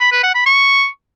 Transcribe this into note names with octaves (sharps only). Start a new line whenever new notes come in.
B5
B4
F#5
B5
C#6